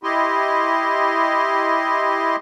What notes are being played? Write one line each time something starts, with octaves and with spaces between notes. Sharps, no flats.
E4 G4 D#5 C6